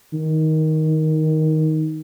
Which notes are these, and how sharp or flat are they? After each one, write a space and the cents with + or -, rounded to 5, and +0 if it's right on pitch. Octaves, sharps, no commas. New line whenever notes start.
D#3 +10